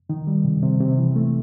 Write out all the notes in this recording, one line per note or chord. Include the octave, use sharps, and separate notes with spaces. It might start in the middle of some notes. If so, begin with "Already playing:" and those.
D#3
G3
C3
C3
C3
E3
A3